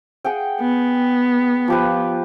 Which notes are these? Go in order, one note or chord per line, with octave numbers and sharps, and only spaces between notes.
G#4 F#5 G5
B3
F3 G4 B4